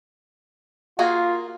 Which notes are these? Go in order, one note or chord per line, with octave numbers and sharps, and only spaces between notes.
A#3 F4 F#4 G#4